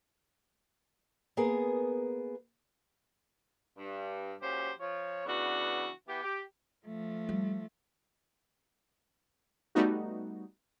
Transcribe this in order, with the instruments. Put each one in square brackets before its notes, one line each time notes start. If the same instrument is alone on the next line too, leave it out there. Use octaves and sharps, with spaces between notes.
[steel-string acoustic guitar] A#3 B3 G#4 A#4
[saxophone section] G2
A#2 F#3 C#4 G4 C5
F3 C#5
C#3 E3 B3 D4 F#4
E3 B3 G4
G4
[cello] F3 A3
[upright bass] G3
[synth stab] G3 A3 B3 D#4 F#4